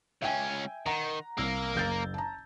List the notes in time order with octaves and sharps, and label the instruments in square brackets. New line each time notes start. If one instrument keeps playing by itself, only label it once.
[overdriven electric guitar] C#2 C#4 [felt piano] E5 G5 G#5
[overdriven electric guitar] D#3 [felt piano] F#5 A#5
[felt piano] C2 E6 [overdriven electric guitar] A#3 A#4
[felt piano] F#1 G6 A6
A5 A#5